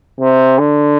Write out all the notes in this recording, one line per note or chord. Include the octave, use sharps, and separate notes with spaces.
C3
D3